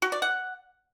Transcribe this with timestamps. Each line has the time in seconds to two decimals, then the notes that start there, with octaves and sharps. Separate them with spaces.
0.02 F#4
0.12 D5
0.22 F#5